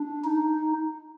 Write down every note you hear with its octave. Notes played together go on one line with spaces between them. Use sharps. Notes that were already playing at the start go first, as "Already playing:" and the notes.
Already playing: D4
D#4